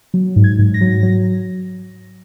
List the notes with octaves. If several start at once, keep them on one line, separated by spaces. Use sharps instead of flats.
F#3
G#2
G#6
G#2
A#6
F#3
F#3